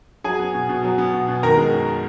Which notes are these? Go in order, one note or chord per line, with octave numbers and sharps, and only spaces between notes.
F#3 G#4 G#5
B3
B2
B2
F#3
B3
B2
B2
D#3 A#4 A#5
G#3
F#2